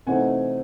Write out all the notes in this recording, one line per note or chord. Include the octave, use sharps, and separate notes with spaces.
C3 E3 A3 C4 D#4 F#5 G#5